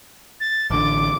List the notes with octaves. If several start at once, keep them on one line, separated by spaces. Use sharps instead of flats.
A6
A1 D3 D6